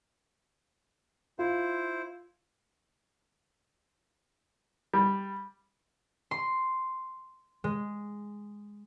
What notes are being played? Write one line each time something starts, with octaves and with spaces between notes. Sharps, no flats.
E4 F4 C5
G3
C6
G#3